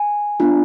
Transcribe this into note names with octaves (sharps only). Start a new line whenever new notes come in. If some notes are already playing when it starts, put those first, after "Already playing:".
Already playing: G#5
B3 D4 F4